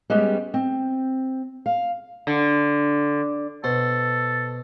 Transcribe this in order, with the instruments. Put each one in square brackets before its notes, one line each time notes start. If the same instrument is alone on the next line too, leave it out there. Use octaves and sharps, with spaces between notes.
[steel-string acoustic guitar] G3 G#3 B3 C#4 G4
C4
F5
[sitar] D3
[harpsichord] B2 C5 [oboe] A4